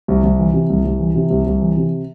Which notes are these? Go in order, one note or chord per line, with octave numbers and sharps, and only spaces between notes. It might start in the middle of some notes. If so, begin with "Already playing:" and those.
C2
C2
E3
C3
C2
C2
E3
C3
C2
C2
E3
C3